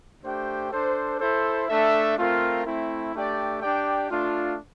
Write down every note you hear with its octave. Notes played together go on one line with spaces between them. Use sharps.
A3 D4 G4 C5 G5
D4 A4 C5
E4 A4 C5
A3 D4 A4 E5
A3 C4 F4 A#4
A3 C4 E4
A3 D4 G4 D5 G5
D4 G4 D5 G5
A3 D4 F4